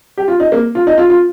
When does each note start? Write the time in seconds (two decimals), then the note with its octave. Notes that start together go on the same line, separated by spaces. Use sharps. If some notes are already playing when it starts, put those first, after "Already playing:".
0.17 G4
0.28 F4
0.40 D#4
0.52 A#3
0.75 F4
0.87 D#4
0.97 F4
1.10 F4